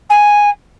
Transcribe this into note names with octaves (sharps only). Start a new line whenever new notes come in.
G#5